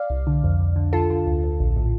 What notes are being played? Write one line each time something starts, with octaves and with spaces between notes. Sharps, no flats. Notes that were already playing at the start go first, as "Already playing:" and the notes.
Already playing: D5 F5
C2
D3
F2
F2
D3
D3 F4 A4
D3
D2
D2
A#1
A2